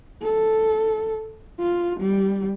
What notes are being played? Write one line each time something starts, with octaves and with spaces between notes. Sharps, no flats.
A4
F4
G3